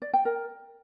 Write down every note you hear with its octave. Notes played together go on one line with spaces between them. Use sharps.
D5
G5
A#4